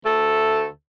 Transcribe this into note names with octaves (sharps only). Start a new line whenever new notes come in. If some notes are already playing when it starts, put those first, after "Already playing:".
D2 A3 A4